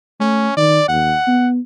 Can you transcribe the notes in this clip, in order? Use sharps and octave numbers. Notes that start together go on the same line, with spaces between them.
A3 C#4
D#3 D5
D#2 F#5
B3